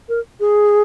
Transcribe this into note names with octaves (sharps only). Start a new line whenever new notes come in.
A#4
G#4